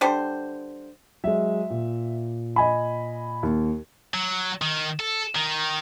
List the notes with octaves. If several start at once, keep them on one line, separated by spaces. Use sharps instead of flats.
D3 G3 C5
F#3 G#3 E5
A#2
D#5 G#5 B5
D#2
F#3
D#3
A4
D#3